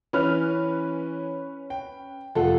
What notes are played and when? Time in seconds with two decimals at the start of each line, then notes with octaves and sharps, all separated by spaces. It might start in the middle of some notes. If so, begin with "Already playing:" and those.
0.13 E3 C#4 B4 F6
1.70 G5
2.35 F1 F4 A4 F#5